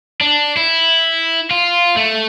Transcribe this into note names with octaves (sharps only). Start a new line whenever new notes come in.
D4
E4
F4
A3